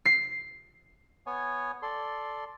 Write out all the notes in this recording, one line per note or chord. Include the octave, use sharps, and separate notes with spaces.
C7
B3 C#5 G#5
A4 D5 C6